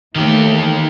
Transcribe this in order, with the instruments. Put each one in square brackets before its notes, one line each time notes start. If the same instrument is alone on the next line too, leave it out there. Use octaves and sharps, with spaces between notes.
[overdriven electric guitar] D#3 G4 [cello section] E3 A3